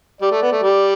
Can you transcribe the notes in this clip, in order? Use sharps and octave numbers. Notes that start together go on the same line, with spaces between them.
G3 D5
A3
B3
A3
G3